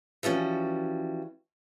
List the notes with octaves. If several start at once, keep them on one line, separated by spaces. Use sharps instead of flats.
E3 F3 G3 C#4 F#4